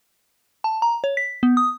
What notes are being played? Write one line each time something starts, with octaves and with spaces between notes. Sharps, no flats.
A5
A#5
C#5
B6
B3
D#6